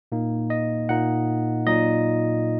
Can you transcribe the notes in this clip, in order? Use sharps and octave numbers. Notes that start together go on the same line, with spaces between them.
A#2 A#3 D#4
D#5
A#2 A#3 D#4 F#5
A#2 F#3 D#4 D#5